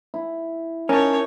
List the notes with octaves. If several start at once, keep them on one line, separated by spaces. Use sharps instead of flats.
E4
C#4 D#4 A#4 C#5 A5